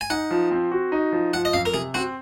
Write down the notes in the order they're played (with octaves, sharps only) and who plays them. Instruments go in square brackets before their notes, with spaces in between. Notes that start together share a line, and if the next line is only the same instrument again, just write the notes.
[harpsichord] G#5
[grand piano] D#4 [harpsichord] F#5
[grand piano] F3
C4
F#4
D#4
F3
[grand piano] F3 [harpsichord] F#5
[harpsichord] D#5
[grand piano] F2 [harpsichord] F5
[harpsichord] A#4
[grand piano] C3 [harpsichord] G#4
[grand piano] C4 [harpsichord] F#4